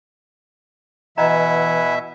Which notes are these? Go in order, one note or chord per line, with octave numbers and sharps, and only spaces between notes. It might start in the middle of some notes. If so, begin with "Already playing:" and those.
B2 E3 E4 D#5 E5 F#5 G#5 A#5